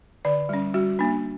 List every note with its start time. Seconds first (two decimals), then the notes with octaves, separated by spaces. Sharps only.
0.25 D3 D5
0.49 G3 C#4
0.74 G3 F#4
0.99 A#3 D4